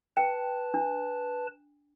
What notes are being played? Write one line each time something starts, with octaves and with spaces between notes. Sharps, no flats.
B4 G5 A5
D4